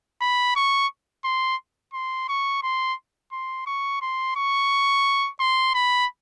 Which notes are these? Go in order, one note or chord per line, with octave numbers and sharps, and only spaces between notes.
B5
C#6
C6
C6
C#6
C6
C6
C#6
C6
C#6
C6
B5